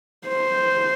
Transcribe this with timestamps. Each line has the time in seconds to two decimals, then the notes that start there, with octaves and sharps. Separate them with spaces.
0.28 C5